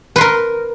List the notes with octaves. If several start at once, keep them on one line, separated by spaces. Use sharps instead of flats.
A#4 B4 C6